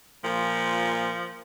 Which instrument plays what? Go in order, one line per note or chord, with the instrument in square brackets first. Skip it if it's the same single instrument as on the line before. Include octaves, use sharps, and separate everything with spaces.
[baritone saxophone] A#2 [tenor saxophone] F3